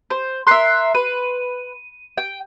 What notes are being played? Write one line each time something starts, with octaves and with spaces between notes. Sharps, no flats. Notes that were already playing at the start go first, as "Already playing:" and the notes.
C5
A#4 E5 C6 F#6 C7
B4 D#7
G5